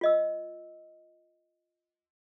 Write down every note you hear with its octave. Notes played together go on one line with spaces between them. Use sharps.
F4 D#5 E6